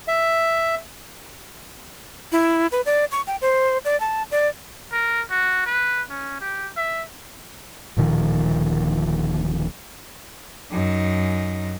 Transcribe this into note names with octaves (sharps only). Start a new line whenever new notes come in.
E5
E4
B4
D5
C#6
G5
C5
D5
A5
D5
A#4
F#4
B4
C#4
G4
E5
D1 A#2 D#3 F3
F#2 D#4